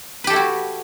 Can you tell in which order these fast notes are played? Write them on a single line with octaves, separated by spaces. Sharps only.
B4 G4 A4 E4 F#4